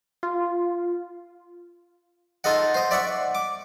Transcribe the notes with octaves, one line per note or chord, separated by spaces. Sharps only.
F4
D#4 F4 A4 D#5 F#5
C5 D#5
D5 E5 F#5 C#6
D6